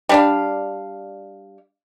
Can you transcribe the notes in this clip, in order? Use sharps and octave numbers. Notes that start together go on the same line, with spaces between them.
G3 D4 F5